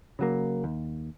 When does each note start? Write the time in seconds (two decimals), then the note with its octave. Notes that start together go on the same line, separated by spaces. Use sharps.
0.19 C#3 F#3 A#3
0.64 D#2